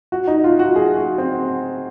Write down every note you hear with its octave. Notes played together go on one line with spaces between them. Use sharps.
F#4
D#4
F4
F#4
G#4
F#4
C4